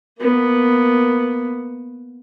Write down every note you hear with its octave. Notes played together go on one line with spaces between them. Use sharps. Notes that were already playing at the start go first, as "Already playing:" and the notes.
A#3 B3